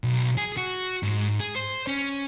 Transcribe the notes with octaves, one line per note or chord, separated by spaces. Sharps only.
B1
G#4
F#4
G#2
G#4
C5
C#4